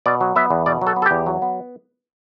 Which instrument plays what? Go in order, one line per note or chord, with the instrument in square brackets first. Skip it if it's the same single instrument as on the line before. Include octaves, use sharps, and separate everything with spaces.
[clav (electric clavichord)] B2 D5
F#3
B3 E5
E2
B2 D5
F#3
A4
B3
A4
G4
E2
F#3
B3